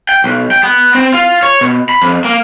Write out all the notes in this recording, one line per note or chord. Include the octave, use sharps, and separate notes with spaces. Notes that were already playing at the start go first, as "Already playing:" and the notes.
G5
B1
G5
B3
C4
F4
C#5
B2
B5
F2
A#3